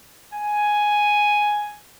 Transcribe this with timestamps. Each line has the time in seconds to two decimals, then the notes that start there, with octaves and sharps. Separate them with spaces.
0.34 G#5